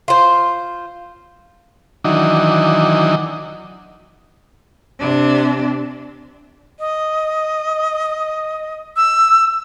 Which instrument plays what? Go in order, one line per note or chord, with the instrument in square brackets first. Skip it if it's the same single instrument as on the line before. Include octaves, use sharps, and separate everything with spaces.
[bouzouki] F4 C5
[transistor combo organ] D#3 E3 F#3 D4 D#4
[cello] C3 D4
[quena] D#5
E6